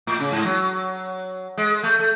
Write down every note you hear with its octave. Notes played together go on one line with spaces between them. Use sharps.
A2
C#3
G#2
F#3
G#3
A3
A3